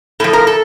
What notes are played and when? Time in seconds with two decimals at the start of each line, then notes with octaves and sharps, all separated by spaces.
0.20 A2 F3 A4
0.33 A#4
0.47 A4